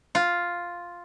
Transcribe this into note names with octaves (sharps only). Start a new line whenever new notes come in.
F4